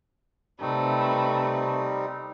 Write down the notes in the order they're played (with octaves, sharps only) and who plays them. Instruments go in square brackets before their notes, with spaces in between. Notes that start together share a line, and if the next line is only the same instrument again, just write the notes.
[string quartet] C3 A3 B4 [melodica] G3 C4 D#4